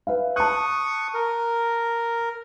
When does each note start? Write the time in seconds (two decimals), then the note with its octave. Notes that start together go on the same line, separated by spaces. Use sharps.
0.07 B4 E5 F5
0.36 A5 C#6 D#6 F#6
1.14 A#4